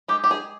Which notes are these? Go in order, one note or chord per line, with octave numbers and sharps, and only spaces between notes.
G#3 G4
G4
G#4